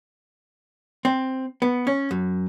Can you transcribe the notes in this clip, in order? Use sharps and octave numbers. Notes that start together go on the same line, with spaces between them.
C4
B3
C#4
F#2